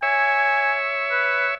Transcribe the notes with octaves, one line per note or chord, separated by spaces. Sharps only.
C#5 E5 G#5
B4